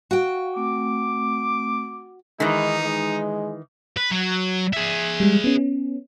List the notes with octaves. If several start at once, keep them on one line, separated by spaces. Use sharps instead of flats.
F#4 F5 G5 C#6
A3 C4 D6
D#3 E3 G#3 D#4
G#3
B4
F#3
G#4 E5
G3 G#3
B3 C#4